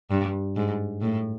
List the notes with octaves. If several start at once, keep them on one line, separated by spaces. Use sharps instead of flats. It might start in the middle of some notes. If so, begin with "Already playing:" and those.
G2
G#2
A2